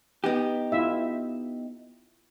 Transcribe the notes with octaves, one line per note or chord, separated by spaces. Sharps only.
B3 D#4 G4
E4 F4 E5